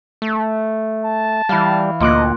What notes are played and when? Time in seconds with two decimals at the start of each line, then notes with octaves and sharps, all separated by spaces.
0.22 A3
1.05 A5
1.49 E3 G3 F5
2.00 D2 A#2 D#5 D6 F#6